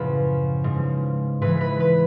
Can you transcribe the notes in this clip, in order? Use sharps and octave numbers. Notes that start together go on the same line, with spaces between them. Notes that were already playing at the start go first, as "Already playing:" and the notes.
Already playing: F#2 A2 C#3 F3 B4 B5
G#2 F3
G#2 E3 B4 B5
B4 B5
B4 B5